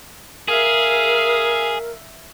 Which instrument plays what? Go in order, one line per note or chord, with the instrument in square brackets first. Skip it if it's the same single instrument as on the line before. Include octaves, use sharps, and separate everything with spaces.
[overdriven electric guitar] G#4 [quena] A#4 [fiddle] E5 F5